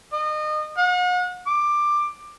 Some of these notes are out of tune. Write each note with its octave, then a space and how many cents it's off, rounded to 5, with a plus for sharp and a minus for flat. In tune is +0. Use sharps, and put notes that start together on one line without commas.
D#5 -30
F#5 -40
D6 +15